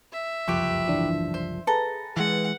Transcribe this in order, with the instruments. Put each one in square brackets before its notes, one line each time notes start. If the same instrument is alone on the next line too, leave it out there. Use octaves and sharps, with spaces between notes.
[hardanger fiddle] E5
[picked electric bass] F#1 C2 F3 [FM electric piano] F2 [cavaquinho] G4 B4 C#6
[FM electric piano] G#1 E3 D4
[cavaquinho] C5
[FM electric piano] G#4 B4 [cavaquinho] A4 A#5
[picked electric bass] E3 G#3 [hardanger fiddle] F#5